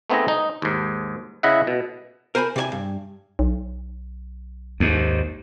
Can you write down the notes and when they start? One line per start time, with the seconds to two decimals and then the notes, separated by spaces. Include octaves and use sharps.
0.10 A3 B3 C4 D#4 G#4 D#5
0.28 D#4
0.62 D#2 G#2
1.43 C#3 E4 D#5 E5 F#5
1.67 B2
2.35 A#4 C5 G#5 A#5 B5
2.56 C3 D5 G#5
2.72 G2
3.39 B1
4.80 D#2 G#2